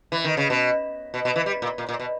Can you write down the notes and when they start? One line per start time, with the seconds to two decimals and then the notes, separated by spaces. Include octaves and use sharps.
0.12 E3
0.24 D#3
0.37 C#3
0.50 B2
1.14 B2
1.25 B2
1.36 E3
1.46 G3
1.62 A#2
1.78 A#2
1.89 A#2
2.00 B2